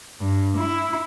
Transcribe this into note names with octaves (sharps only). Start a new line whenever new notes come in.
G2
E4